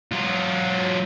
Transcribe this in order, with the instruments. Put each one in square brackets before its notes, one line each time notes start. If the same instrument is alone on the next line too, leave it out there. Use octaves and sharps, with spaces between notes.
[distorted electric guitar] F#3 F4